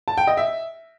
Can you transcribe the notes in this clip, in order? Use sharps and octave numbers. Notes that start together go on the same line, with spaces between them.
A5
G5
D#5
E5